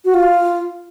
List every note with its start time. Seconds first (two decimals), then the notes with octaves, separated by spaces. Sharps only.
0.05 F#4
0.14 F4